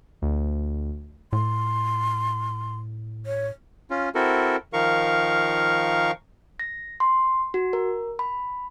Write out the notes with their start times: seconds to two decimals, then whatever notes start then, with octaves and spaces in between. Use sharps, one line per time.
0.22 D2
1.33 A2 C6
3.26 C#5
3.90 C#4 F4
4.15 C4 E4 F#4 A4 A#4
4.73 D#3 F3 A#4 F5 C#6
6.59 A#6
7.00 C6
7.54 F#4
7.73 A#4
8.19 B5